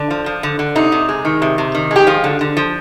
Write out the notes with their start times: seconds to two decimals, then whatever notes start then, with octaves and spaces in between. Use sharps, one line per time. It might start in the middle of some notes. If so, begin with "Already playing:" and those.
Already playing: D3 D4
0.10 F3
0.26 F3
0.43 D3
0.59 D3
0.75 C3 D#4
0.92 C3
1.09 G#3
1.25 D#3
1.42 C3
1.58 C3
1.75 D#3
1.91 G#3 G4
2.07 F3 F4
2.24 D3
2.41 D3
2.57 F3